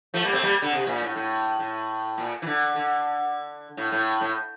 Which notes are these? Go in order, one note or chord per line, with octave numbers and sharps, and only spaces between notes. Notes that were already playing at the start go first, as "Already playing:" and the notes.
F3 A3
G3 A#3
A3 C4
G3 A#3
D3
C3
A#2
A2
A2
A2
A#2
E3
D3
D3
A2
A2
A2